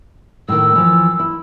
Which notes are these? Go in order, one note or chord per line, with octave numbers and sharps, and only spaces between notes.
A2 D#3 E6
E3 F3
E4